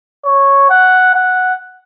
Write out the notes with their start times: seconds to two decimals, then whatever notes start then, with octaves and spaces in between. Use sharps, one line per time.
0.25 C#5
0.70 F#5
1.14 F#5